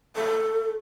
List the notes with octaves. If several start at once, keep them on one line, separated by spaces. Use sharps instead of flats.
A4